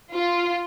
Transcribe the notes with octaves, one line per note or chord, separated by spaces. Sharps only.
F4